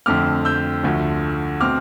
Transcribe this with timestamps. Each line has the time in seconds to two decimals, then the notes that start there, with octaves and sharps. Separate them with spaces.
0.06 F2 D3 A3 C4 D6 F6
0.45 E6 G6
0.83 D2 D3 F3 A3
1.60 B2 A3 C4 D6 F6